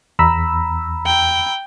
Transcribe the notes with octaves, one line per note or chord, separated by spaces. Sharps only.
E2 A#5 B5 E6
G5